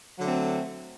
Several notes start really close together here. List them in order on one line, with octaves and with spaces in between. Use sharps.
F#3 D3 A3 C4